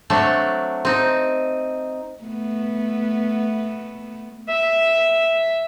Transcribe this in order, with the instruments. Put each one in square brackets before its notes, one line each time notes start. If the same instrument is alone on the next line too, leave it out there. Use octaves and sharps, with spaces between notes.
[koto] F#3 A3 C4 D4
C4 D#4
[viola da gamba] A3 B3
[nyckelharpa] E5